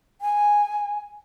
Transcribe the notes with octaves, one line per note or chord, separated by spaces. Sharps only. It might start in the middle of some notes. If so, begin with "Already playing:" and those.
G#5